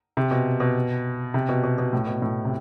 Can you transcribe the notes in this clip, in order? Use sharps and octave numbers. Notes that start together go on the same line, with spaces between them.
C3
B2
B2
C3
B2
B2
B2
A2
B2
A2
C3